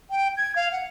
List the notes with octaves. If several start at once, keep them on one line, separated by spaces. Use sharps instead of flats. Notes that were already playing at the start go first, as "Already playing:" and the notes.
G5
G#6
F5
F#5